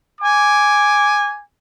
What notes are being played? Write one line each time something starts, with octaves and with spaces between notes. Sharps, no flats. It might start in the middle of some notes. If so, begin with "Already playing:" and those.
G#5 D6